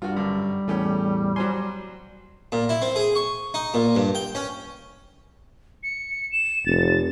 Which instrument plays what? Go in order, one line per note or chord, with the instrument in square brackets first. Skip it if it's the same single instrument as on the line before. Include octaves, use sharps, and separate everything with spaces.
[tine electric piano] G2 [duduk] G3 [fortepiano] F4 F#4
[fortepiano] F#2 D3
[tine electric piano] E2 A2 [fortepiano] A3 C#4 G4
[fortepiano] F#3 C5 G#5 [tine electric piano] C6
[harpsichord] A#2
E4
C4
G#4
C#6
D#4
A#2
G2
G5
C#4
[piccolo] C#7
E7
[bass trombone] F1 [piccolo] A6